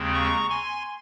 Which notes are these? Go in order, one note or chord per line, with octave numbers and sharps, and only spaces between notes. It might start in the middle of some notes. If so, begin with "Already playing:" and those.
Already playing: D#2 C#3 G#3 C4
A#5 C#6
G#5 C6